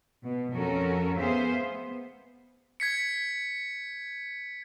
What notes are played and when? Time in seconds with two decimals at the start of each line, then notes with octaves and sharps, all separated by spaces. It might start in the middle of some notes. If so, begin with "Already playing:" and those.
0.22 B2
0.54 F2 C#4 F#4 A4 A#4
1.17 B3 G#4 C5 E5 F5
1.60 B3
2.80 G#6 B6 C#7